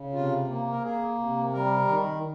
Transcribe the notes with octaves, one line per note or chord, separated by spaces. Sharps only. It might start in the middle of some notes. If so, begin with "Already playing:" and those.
Already playing: C#3
C3 F4
A#3
A#4
A#3 G#4
C3
G3 A#4
D#3